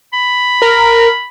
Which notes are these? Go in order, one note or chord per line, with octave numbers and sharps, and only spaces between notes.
B5
A#4